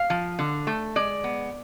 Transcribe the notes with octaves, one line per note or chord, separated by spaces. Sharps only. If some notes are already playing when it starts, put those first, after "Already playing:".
Already playing: F5
F3
D3
A3
G#3 D5
B3